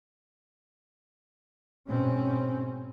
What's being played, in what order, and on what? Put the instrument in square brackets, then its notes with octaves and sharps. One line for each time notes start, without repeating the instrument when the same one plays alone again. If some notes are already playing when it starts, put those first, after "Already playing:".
[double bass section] G#2 B2 C4 C#4